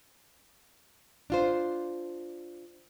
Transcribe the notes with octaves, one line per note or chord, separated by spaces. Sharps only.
D4 F4 C5